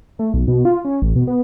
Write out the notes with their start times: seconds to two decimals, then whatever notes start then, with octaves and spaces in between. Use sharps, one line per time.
0.19 A3
0.34 B1
0.48 B2
0.65 F4
0.85 C#4
1.02 A1
1.16 B2
1.27 B3